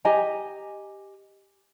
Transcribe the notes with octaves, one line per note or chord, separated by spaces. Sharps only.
G4 D#5 G#5 A#5